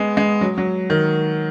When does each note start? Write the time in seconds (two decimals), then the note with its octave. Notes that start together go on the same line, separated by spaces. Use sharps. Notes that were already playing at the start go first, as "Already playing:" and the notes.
Already playing: G#3 B3
0.17 G#3
0.41 F#3
0.58 F#3
0.90 D#3